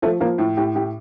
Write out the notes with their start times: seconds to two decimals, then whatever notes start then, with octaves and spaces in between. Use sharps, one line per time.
0.02 F3 A3
0.20 F3 A#3
0.38 A2
0.57 A2 G4
0.75 A2 G4